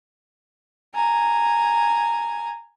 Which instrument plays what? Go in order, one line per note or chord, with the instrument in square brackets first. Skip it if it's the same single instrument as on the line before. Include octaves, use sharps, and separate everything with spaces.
[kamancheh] G#5 A#5